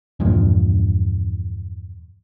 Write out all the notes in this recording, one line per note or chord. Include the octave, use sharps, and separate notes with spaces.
E2 G2 A#2 F3